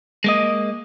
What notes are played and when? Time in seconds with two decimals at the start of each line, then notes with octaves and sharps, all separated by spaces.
0.24 G#3 A#3 D#5